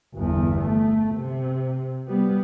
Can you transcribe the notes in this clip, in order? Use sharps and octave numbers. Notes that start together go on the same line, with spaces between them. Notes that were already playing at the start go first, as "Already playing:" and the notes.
G1 E2
A3
C3
G3 B3